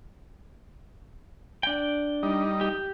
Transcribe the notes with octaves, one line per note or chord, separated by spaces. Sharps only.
D4 G5
G3 D#4
G4